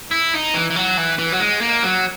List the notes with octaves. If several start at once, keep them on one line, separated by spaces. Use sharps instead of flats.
E4
D#4
E3
E3
F#3
E3
E3
F#3
G#3
A#3
F#3